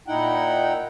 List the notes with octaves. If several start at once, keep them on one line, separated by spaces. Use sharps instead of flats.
A#2 D#4 E4 F#5 G5